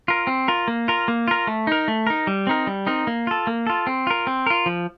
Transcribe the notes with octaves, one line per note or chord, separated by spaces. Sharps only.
F4 A#4
C4
F4 A#4
A#3
F4 A#4
A#3
F4 A#4
A3
D#4 A#4
A3
D#4 A#4
G3
C4 D#4 A#4
G3
C4 D#4 A#4
A#3
F4 A4
A#3
F4 A4
C4
F4 A#4
C4
F4 A#4
F3